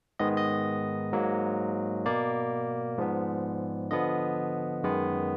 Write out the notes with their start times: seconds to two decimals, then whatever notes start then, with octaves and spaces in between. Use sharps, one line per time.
0.19 G#2 D#3 G#3 B3 D#5
0.37 D#5
1.13 G#2 F#3 A#3
2.06 B2 A#3 D5
2.98 G#2 F3 B3
3.91 D3 F3 B3 D#5
4.84 F#2 D#3 G#3 B3